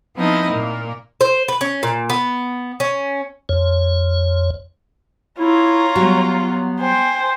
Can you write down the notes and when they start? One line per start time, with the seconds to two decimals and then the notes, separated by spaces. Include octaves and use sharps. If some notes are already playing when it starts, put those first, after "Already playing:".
0.17 F3 B3 C4 D#4 E4 D#5
0.49 A#2 A#3
1.21 C5
1.48 B4
1.61 C#4
1.83 A#2
2.10 B3
2.80 C#4
3.49 F2 C#5
5.39 E4 F4 C#5 A#5
5.95 F#3 G3 B3 F#4
6.80 C5 G5 G#5